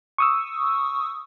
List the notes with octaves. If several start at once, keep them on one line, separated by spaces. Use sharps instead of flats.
C#6 D#6 E6